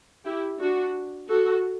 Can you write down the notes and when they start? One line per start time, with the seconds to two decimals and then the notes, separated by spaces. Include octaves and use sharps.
0.25 E4 G4
0.60 D4 F#4
1.28 F#4 A4